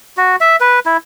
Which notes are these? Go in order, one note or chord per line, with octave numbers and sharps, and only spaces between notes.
F#4
E5
B4
E4